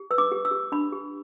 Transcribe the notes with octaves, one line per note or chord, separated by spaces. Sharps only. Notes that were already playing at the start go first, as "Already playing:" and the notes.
Already playing: G4
B4 E6
D6
G4
E6
G4
D4 B5
G4